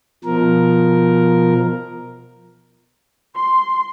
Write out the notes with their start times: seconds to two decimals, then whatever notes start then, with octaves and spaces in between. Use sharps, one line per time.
0.25 B2 F3 A#4
3.34 C6